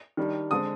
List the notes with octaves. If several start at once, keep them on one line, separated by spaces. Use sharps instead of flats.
D#3 G3 D4
D3 G#3 C4 D#6